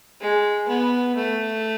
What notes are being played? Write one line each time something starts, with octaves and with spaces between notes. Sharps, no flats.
G#3
B3
A3